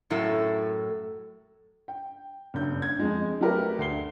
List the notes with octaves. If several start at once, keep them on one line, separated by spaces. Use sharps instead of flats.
F#2 A2 F#3 A4 E5
G5
F#1 G2 G6
G#6
F2 G#3
F#3 A3 G4 A#4 B4
D2 D4 C7 G7